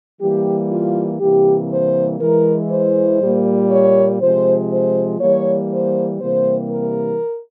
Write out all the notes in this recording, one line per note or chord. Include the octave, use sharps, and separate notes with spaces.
E3 G3 A#3 G4
F4
C3 E3 G3 A#3 G4
C5
E3 G#3 A#4
C5
A#2 G3 A#3
C#5
C3 F3 G#3 C5
C5
E3 G3 A#3 C#5
C5
C3 E3 G3 A#3 C5
A#4